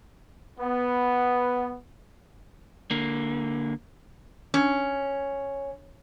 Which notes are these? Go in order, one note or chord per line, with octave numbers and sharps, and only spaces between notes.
B3
D3 A#3
C#4